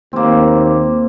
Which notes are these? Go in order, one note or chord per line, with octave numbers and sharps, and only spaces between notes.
D#2 A#3 C4